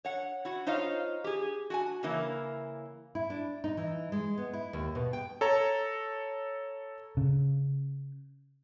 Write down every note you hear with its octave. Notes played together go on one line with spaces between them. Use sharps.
C#5 F#5
E4 F#4 F#5
D#4 F4 C5 C#5 D#5 F5
G4 G#4
F#4 G5 G#5
C#3 E3 A#3 E4
E4
D4
D#4
E3
G#3
B3
E4
D#2
B2
G5
A4 C#5 A#5
C#3